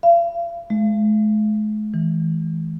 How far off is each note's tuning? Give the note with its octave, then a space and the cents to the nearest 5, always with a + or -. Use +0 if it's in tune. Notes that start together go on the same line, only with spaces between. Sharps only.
F5 -40
G#3 +45
E3 -20